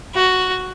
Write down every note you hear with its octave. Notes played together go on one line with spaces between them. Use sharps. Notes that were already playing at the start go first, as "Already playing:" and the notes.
F#4